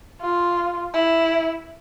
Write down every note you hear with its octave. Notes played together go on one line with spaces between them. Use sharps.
F4
E4